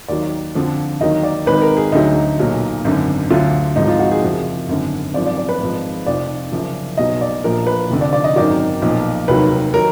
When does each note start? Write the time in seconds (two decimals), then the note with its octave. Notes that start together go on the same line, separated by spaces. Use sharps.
0.08 D#2 D#3 F#3 D5
0.55 F2 D3 F3
1.01 D#2 D#3 F#3 D#5
1.23 D5
1.46 G#1 G#2 D#3 B4
1.62 A#4
1.77 G#4
1.92 D2 D3 F#3 D#4
2.39 B1 A#2 F#3
2.84 G#1 F#2 D3
3.30 D2 D3 F#3 F4
3.76 G#1 G#2 F3 D#4
3.87 F4
3.99 F#4
4.11 G#4
4.22 F#1 F2 F3
4.69 G#1 F#2 D3
5.14 G#1 F#2 F3 D5
5.26 D5
5.38 D5
5.49 B4
5.60 G#1 G#2 F3
6.06 F1 F2 F3 D5
6.52 F#1 F#2 F3
6.98 B1 B2 F#3 D#5
7.21 D5
7.44 A#1 A#2 F3 A#4
7.67 B4
7.90 F1 F2 D3
8.01 D5
8.13 D5
8.24 D#5
8.36 G#1 F#2 D#3 F#3 D5
8.82 B1 A#2 F3
9.28 F1 D#2 D#3 F#3 B4
9.74 D#3 F#3 A#4